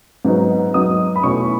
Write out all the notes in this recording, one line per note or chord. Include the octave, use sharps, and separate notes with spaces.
G#2 F#3 B3 D#4
G#2 F#3 B3 D#4 D#6
B5
B2 A3 C#4 E4 C#6